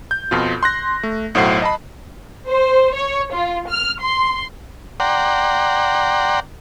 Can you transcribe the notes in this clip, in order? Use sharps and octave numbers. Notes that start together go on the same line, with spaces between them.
G6
F2 B2 F4
C6 F#6 A#6
A3
B1 A2 F#3 C5 F#5 C7
D#5 A5 B5
C5
C#5
F4
F6
C6
D5 F#5 G5 A#5 C6